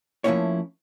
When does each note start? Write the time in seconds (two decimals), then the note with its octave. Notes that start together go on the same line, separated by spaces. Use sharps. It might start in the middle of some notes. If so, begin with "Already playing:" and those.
0.24 F3 A3 A#3 C#4 E4 C#5